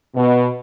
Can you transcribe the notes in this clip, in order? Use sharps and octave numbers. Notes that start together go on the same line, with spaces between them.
B2